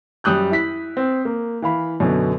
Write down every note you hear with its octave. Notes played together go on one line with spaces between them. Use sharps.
F#2 G3 D#6 F#6 G6
E4 B6
C4
A#3
E3 F5 B5
F#2 B2 D3